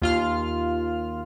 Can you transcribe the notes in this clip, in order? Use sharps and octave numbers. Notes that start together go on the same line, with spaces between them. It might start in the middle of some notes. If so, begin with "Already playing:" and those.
D#2 F4 F6